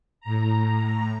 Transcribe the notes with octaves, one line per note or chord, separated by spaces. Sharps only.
A2 A#5